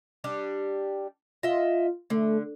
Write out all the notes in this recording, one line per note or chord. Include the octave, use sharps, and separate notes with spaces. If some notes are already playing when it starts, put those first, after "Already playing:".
G3 D4 G4
F4 D#5 E5
D3 A3